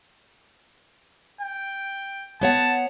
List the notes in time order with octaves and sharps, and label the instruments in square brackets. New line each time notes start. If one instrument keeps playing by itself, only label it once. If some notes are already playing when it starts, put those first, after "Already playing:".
[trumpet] G5
[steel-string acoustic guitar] B3 C#5 F#5 [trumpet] A5